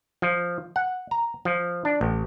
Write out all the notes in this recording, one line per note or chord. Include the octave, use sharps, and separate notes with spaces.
F3
F#5
A#5
F3
D4
A1